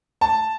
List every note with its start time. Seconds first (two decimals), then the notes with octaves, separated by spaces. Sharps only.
0.21 A5